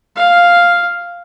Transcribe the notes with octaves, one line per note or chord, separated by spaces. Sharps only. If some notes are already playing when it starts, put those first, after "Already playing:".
F5